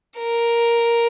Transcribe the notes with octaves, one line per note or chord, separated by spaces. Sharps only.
A#4